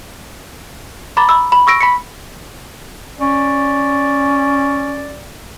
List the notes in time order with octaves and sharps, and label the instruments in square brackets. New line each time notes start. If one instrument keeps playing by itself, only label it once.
[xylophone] A#5 B5 D6 A6
B5 E6
B5
C#6 E6 A#6 D7
B5 B6 C#7
[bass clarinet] C#4 [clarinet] D5